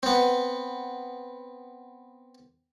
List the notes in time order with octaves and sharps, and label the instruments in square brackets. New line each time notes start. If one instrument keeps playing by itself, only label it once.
[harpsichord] B3 C4